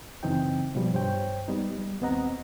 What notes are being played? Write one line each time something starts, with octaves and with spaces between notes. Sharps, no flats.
F#2 C#3 E3 C4 D#4 G5
B2 F3 G3
G2 C5 C#5 G5
G3 B3 D#4
G3
D#2 B3 C4 D#5 F#5 A#5